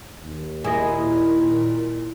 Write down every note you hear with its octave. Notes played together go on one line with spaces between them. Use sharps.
D#2
A#2 E4 G#4 D#5